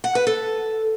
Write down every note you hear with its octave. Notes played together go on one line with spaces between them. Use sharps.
F#5
B4
A4